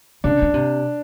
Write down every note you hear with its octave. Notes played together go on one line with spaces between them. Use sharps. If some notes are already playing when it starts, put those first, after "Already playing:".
C#3 D4
C#3
C3